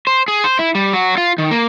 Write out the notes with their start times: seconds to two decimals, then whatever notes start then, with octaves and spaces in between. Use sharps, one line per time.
0.07 C5
0.28 G#4
0.44 C5
0.59 E4
0.75 G3
0.93 F#3
1.18 F4
1.38 D#3
1.51 A#3